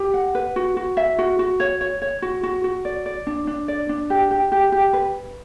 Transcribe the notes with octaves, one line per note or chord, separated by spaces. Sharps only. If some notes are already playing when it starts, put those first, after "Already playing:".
Already playing: G4
F#5
B4
F#4
F#4
E5
F#4
F#4
C#5
C#5
C#5
F#4
F#4
F#4
D5
D5
D4
D4
D5
D4
G4
G4
G4
G4
B4